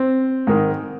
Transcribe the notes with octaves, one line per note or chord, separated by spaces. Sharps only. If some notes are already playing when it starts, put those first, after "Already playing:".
Already playing: C4
G#2 D#3